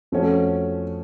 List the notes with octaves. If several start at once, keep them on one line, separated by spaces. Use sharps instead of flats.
F2 F3 A3 C#4 F#4